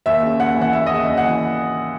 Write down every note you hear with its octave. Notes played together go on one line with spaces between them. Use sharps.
D#2 E5
C#3
D#2 F#5
E3
F#5
D#2 E5
C#3 D#5
E5
D#2
F#5
E3